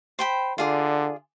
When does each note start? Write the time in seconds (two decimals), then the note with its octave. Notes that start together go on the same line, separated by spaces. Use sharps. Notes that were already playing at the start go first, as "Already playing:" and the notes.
0.19 C5 G5 B5
0.58 D3 F4 G#4 D5